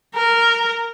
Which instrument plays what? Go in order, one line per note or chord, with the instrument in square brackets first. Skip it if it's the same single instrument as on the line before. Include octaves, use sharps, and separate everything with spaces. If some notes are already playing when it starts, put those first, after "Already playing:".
[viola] A#4